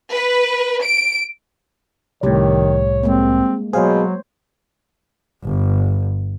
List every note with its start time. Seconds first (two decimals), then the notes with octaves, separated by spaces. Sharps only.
0.12 B4
0.84 D7
2.23 C2 A2 D#3 G3 G4 C#5
3.03 G#3 A#3 C4
3.73 B2 F#3 G#4 C5 C#5 F5
5.44 G1